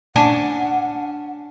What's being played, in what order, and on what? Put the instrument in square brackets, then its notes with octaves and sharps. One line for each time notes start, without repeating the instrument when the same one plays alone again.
[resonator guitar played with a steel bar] C#4 G#5 A5 [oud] D4 [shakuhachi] F#5